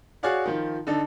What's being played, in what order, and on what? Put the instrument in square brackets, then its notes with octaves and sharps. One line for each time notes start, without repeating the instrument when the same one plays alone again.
[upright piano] F#4 G#4 C#5 D5 F5 F#5
D#3 F3
D3 D#4 A4